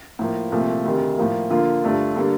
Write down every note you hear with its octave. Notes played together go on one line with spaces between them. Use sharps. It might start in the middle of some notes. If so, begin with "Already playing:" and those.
A2 F3 A#3
C2 A#2 F3 A3
D2 C3 D#3
A2 F3 A#3
D3 F3 A#3 F4
G2 D3 A3 D4 F4
D3 G3 A#3 D4